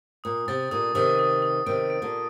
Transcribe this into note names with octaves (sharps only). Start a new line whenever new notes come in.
A#2 D#6
C3 A6
A#2 D3 D#6
C3 D#3 D#6
D#6
D#6
C3 D#3 D7
D7
A#2 D3